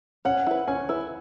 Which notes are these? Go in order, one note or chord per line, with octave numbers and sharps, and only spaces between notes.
C#4 F#5
E4 B4
C#4 G#5
E4 B4